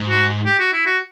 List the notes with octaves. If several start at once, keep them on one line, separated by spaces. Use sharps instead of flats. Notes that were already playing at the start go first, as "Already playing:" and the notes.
Already playing: G#2
F#4
G4
F#4
E4
F#4